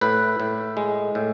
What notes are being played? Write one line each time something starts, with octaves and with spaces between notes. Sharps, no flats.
A2 B4
A2
G#3
A2